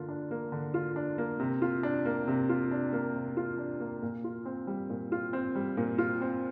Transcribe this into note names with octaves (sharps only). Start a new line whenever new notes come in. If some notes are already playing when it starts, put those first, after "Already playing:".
Already playing: D3 A#3 F4
D4
A#3
D3
F4
D4
A#3
C3
F4
D4
A#3
C3
F4
D4
A#3
C3
F4
D4
A#3
A#2
F4
C4
G3
A#2
F4
C4
G3
A#2
F4
C4